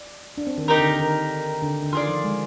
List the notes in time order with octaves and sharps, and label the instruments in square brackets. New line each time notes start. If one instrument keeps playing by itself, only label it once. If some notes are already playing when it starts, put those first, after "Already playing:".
Already playing: [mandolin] D5
[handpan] D4
C4
D#3
[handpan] D#3 [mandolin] D#4 G4 A#4
[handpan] D3
D3
D#3
D3
D3
[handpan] D#3 [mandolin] F4 G#4 D5
[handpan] F3
G#3